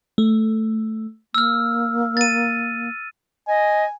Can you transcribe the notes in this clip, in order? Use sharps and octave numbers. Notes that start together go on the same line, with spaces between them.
A3
A#3 E6 F6
A6 D#7
D#5 G#5